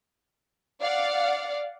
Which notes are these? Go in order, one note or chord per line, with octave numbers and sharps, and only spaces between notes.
D5 F5 F#5